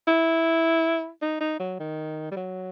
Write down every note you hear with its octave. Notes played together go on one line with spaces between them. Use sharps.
E4
D#4
D#4
F#3
D#3
G3
F#3